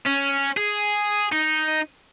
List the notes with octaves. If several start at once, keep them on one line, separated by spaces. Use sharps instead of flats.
C#4
G#4
D#4